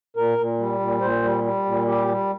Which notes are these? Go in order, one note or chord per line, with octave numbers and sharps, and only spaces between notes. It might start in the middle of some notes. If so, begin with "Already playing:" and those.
A#2 A#4
A#2
G3
A#2
A#2 C5
G3
G3
A#2
G3 G4
G3